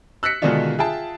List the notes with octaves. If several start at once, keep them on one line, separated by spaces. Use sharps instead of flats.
E6 F#6 A#6 B6 C#7
B2 D3 D#3 G#3 D4 F4
F4 G#4 E5 G5 A5